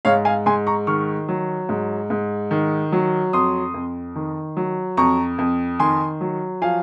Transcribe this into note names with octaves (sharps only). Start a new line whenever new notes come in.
G#2 C#5 F5
F5 G#5
G#2 G#5 C6
A#5 C#6
D#3 C#6 F6
F#3
G#2
G#2
D#3
F#3
F2 C6 D#6
F2
D#3
F#3
F2 A#5 C#6
F2
D#3 G#5 C6
F#3
F3 F5 G#5